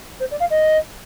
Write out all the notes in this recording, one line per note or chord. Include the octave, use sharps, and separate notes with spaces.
C5
D5
F5
D#5